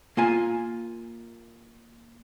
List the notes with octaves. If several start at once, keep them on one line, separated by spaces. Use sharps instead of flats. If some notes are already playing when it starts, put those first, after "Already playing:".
A#3 F4 G#5